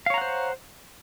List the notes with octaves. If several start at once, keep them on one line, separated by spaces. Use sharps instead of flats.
C5 C#5 F5 F#5 A#5